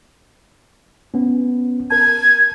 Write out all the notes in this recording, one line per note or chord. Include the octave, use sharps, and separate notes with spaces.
B3 C#4
A#4 A5 G#6